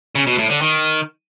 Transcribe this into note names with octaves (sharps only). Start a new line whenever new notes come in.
C#3
B2
A2
D3
D#3